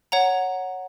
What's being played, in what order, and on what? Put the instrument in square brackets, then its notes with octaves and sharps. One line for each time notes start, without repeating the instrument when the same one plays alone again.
[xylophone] C#5 F#5 A#5